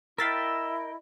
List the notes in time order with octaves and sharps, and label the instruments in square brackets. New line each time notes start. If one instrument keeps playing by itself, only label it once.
[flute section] E4 D#5 [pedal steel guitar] A#4 G5 [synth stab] F5 A6 B6 [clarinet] E6